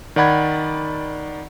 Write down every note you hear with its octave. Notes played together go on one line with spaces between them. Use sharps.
D#3 D5 F#5 B5 G#6